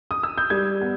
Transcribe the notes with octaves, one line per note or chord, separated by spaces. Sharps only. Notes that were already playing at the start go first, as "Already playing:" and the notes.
D#6
E6
G6
G3 G#6
B3